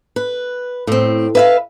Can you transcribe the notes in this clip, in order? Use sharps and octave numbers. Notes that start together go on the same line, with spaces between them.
B4
A2 C4
B4 E5 F5